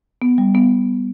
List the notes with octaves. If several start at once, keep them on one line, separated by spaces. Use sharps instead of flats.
B3
G3
B3